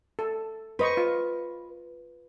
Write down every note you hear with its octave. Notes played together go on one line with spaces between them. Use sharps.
A4
B4 C5 D#5 C#6
F4